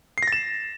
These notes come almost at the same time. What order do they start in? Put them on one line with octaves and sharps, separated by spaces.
C7 A#6 A6 E7